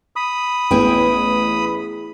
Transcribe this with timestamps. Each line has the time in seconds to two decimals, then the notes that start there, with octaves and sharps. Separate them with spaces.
0.16 B5 D#6
0.71 A1 B3 E4 G#4 G5